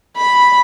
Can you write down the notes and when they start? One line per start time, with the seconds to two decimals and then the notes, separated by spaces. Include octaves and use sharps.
0.17 B5